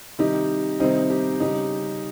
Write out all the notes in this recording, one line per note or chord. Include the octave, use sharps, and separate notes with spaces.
C3 D#3 G3 D#4 G4
C3 D#3 G3 C4 D#4
D#4 G4
C#3 G3 D#4 G4